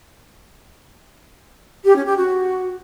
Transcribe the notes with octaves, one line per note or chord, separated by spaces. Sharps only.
G4
C#4
G4
F#4